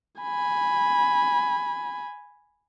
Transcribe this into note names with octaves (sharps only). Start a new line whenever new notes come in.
G#5 B5